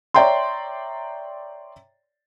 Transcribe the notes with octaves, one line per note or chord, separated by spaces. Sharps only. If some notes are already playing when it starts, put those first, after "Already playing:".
C#5 D5 E5 G5 A#5 C6